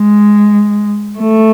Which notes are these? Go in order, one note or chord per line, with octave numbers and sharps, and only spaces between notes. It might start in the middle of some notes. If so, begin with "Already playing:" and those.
Already playing: G#3
A3